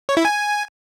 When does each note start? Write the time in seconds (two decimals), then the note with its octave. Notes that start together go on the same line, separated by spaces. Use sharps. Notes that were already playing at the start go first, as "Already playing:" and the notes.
0.09 C#5
0.17 E4
0.25 G#5